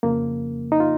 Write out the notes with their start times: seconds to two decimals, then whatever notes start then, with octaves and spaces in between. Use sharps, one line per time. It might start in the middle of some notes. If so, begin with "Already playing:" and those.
0.03 F2 C#3 F3 A#3
0.72 D#4
0.80 F4